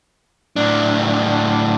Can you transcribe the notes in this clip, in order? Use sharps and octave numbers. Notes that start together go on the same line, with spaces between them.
A2 D4